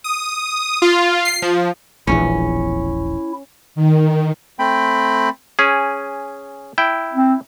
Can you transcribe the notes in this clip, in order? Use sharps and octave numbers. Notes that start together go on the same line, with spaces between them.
D#6
F4
C7
F3
E1 A#1 E2 C#4 E4
D#3
A3 C4 G5 B5
C#4 G#4
E4 G5
C4